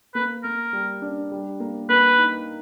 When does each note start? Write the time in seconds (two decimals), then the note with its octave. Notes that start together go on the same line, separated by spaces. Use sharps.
0.15 A#3 B4
0.44 A#3 A#4
0.73 G3
1.02 D4
1.31 G3
1.60 A#3
1.89 A#3 B4
2.18 D#4